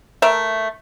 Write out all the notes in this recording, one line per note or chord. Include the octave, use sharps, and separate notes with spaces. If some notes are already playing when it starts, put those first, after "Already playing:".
A3 A#4 E5